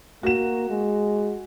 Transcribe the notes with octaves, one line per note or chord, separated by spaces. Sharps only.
A#3 F#4 E7
G#3